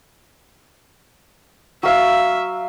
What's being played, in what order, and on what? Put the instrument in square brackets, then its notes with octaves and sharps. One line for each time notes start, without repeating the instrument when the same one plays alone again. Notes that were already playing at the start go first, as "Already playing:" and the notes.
[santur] F#3 F5 [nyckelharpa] E5